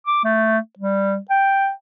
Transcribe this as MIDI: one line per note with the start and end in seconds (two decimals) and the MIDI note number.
0.07 0.20 86
0.24 0.58 57
0.78 1.17 55
1.30 1.70 79